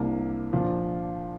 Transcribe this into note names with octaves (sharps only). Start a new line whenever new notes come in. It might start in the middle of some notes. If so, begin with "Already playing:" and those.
Already playing: C2 C3 A#3 D4
A#2 F3 D4 F4